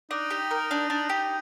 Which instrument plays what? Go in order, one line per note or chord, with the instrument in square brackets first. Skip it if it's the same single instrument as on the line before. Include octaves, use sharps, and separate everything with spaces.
[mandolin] D4 [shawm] D#4
[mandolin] G4
A#4
D4
D4
G4